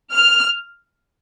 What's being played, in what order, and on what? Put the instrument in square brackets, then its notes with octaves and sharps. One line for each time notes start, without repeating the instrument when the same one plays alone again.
[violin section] F6